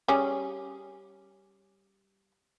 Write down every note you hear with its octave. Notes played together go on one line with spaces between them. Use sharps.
G3 C#4 G#4